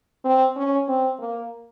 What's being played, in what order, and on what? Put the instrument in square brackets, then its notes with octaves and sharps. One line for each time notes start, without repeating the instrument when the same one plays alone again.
[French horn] C4
C#4
C4
A#3